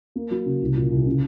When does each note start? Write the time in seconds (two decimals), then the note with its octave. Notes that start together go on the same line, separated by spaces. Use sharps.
0.15 A#3
0.31 F#3
0.46 C#3
0.62 C2
0.76 A#2
0.92 C2
1.07 C#3